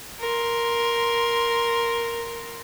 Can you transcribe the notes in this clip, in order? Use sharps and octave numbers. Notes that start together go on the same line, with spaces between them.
A#4 C6